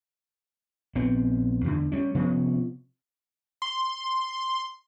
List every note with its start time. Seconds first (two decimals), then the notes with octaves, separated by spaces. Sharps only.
0.95 A#1 B3 C4
1.64 E2 D3
1.92 G3 C#4
2.15 C3 F3 B3 C#4
3.62 C6